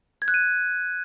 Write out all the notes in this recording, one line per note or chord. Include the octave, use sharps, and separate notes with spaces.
G#6
F#6
D#7